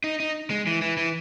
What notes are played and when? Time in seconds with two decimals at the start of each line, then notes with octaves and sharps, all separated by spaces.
0.04 D#4
0.20 D#4
0.50 G#3
0.67 E3
0.82 E3
0.97 E3